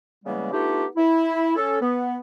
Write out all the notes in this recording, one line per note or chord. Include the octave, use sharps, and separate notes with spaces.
C#3 E3 G3 G#3 A#3 B3
A3 B3 D4 D#4 F4 G4
E4
C#4 A4
B3